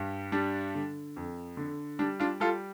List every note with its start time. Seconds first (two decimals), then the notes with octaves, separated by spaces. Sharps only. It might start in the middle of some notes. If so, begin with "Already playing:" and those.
Already playing: G2 G3
0.32 G3 D4
0.75 D3
1.16 F2
1.57 D3
1.99 G3 D4
2.19 D4 F4
2.40 G3 F4 A4